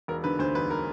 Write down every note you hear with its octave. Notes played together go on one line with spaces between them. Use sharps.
E1 A#4
D3 B4
D2 C5
E1 B4
A#4